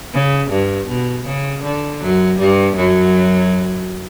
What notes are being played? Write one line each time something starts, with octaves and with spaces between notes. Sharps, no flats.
C#3
G2
B2
C#3
D3
F#2 F#3
G2 G3
F#2 F#3